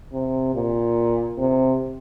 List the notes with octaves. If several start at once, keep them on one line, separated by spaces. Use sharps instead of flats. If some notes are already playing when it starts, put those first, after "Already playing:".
C3
A#2
C3